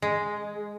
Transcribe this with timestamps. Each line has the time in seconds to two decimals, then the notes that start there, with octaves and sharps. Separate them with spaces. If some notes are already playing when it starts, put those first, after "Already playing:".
0.02 G#3